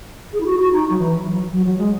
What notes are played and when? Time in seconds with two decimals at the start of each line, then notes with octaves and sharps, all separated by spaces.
0.33 G#4
0.41 E4
0.46 F#4
0.59 F#4
0.73 D#4
0.90 F#3
0.99 E3
1.25 F#3
1.52 F#3
1.66 F#3
1.78 G#3